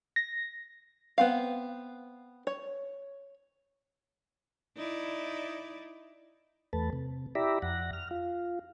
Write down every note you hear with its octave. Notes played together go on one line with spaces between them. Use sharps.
A#6
B3 C4 F5
C#5
D#4 E4 D5
E2 A3 B4 A5
C3
E4 G4 D5 E5 A#5 B5
F2 F#5 A#6
F6
F4